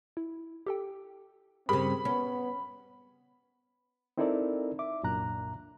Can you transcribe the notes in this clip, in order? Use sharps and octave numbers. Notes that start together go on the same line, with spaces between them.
E4
G4 A4 G5
G2 C#3 C4 G4 G#4 A#4 B5
B3 C#4
C4 D#4 E4 A4 A#4 D5
E5 D6
C2 F#2 A#2 D4 A#5 F#6